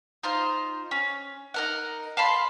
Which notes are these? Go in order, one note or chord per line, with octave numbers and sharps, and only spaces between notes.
D#4 F4 C5 F5
C#4
D#4 A#4 F#5
F5 A5 B5 C6